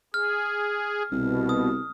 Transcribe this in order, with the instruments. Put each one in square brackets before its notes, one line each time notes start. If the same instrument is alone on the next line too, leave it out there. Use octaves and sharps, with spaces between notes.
[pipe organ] G#4 [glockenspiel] F6
[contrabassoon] C2 [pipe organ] B2
[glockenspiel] D#6